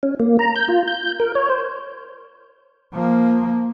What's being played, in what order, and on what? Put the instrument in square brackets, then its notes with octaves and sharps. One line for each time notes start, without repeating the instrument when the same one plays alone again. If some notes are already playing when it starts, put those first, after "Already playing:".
[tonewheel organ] C#4
A#3
A#5
G6
F4
G6
A#4
C#5
C5
[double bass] F3 A#3